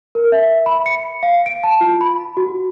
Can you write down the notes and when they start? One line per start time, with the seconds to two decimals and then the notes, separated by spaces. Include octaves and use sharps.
0.15 A#4
0.32 E5
0.66 B5
0.86 C#7
1.23 F5
1.46 D7
1.64 A5
1.81 F4
2.01 B5
2.37 F#4